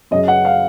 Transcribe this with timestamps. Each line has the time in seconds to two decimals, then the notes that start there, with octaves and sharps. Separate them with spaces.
0.11 F#2 D#5
0.14 C#3
0.28 F#5
0.45 F5